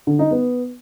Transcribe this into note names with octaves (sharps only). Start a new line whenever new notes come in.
D3
D#4
B3